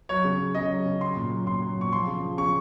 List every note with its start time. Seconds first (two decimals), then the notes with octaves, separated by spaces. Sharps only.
0.09 F#3 C#5
0.24 C#3
0.39 F#3
0.54 C#3 D#5
0.70 F#3
0.85 C#3
1.01 F#3 C6
1.16 A#2
1.31 F#3
1.46 A#2 C6
1.62 F#3
1.77 A#2 C#6
1.92 F3 C6
2.07 C#3
2.22 F3
2.38 C#3 C#6